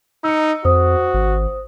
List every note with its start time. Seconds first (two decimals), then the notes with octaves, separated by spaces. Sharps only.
0.24 D#4 E6 C#7
0.65 F2 F#4 C5 D#6
1.14 G#1